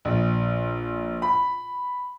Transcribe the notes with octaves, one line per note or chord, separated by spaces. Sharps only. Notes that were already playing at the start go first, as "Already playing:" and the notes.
A#1
B5